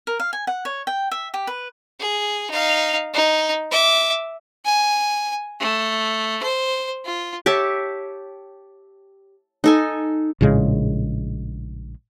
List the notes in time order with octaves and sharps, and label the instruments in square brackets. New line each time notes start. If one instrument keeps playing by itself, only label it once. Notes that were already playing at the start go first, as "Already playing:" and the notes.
[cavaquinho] A#4
F5
G#5
F#5
C#5
G5
E5
G4
B4
[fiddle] G#4
D#4 F5
D#4
E5 D6
G#5
A3
C5
F4
[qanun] G4 C#5 E5 A5
D#4 A4 G#5
[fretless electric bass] A#1 A2 C#3 G#3